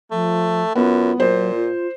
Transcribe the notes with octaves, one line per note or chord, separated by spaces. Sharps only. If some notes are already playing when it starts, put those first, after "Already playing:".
F3 A3
F#2 B3 F4
A#2 F#3 C5
F4